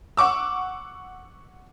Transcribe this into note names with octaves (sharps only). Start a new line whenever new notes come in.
F#5 C#6 D6 E6